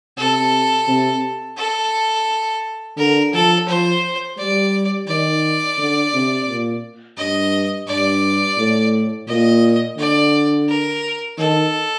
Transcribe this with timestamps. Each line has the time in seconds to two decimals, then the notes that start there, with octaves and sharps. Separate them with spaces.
0.18 C3 A4
0.87 C3
1.57 A4
2.97 D3 A#4
3.33 F3 A4
3.68 F3 C5
4.38 G3 D5
5.07 D#3 D5
5.78 D3
6.13 C3
6.48 A#2
7.17 G2 D#5
7.88 G2 D5
8.58 A2
9.28 A#2 D#5
9.98 D3 D5
10.69 A#4
11.38 D#3 A4